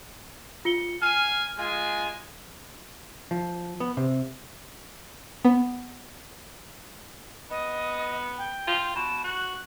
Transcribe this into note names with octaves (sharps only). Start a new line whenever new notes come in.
F4 C#7 G7
F5 G#5 F6
G#3 F4 G#5
F3
B3
C3
B3
B3 D#5
G5
F4
B2 E7
F#4 F#6